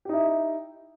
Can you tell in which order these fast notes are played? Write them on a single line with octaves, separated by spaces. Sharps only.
G4 D#4 E4